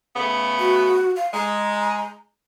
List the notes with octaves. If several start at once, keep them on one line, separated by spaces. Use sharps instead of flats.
C#3 A3 B3
F#4
F5
G#3 A#5